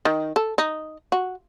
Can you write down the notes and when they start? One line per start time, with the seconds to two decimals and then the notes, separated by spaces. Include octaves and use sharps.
0.05 D#3
0.36 A4
0.58 D#4
1.12 F#4